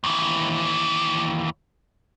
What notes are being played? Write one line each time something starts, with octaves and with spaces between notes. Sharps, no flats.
D#2 E3